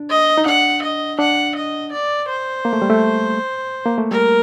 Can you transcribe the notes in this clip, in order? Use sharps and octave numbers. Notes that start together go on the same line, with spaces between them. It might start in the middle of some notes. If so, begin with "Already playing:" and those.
Already playing: D4
D#5
D#4
D4 F#5
D#5
D4 F#5
D#5
D5
C5
A#3
A3
G3
A3
A#3
A3
G3 A#4